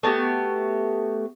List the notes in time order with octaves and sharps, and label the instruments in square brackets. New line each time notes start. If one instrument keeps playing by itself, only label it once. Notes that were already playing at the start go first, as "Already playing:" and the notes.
[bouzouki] A3 B3 F#4 G4